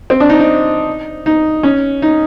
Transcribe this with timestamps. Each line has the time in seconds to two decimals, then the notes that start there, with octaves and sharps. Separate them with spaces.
0.10 C4
0.20 D4
0.29 D#4
0.40 D#4
1.26 D#4
1.63 C#4
2.02 D#4